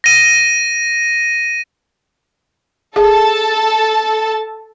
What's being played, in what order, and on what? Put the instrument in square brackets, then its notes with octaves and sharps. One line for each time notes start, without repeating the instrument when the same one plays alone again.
[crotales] A#6 D#7
[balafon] G#4 [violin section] A4 A5